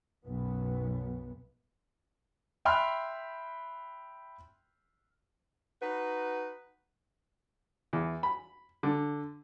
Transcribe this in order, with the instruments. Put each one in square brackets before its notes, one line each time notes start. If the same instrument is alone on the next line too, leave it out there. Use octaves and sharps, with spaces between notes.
[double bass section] B1 F#2 B3
[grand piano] E5 G5 B5 C6 F6 F#6
[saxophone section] D#4 F#4 B4
[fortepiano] E2
B5
D3